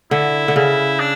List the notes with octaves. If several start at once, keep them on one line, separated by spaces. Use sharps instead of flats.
D3 E4
D3
C#3 E4
D4